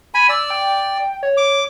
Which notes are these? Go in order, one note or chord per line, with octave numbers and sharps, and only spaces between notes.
G#5 B5
D5 E6
G5
C#5
D6